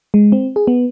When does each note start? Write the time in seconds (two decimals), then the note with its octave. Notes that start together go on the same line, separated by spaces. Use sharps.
0.14 G#3
0.32 C4
0.56 G#4
0.67 B3